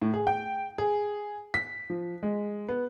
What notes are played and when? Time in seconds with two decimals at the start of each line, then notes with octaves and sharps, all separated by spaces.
0.02 A2
0.14 G#4
0.27 G5
0.78 G#4
1.54 B6
1.90 F3
2.23 G#3
2.69 B3